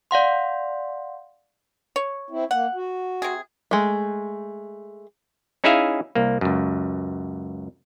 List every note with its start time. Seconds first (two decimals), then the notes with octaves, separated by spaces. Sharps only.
0.11 D5 F5 F#5 C6
1.96 C#5
2.30 C4 E4
2.51 A#3 F#5
2.75 F#4
3.22 C3 G#4
3.71 G#3 A3
5.64 C#4 D#4 E4 G#4 E5 F5
6.15 C2 A#3
6.41 C#2 F#2